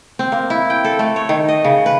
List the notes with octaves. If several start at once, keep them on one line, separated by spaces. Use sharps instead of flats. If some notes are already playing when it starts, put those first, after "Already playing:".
C4
A#3
E4
G5
A4
A3
C#5
D#3
D#5
C#3
B4